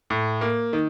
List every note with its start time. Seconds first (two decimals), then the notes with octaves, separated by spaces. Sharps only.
0.10 A2
0.41 A#3
0.73 D#3